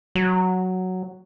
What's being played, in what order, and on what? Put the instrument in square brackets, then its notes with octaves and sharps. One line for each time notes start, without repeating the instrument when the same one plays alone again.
[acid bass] F#3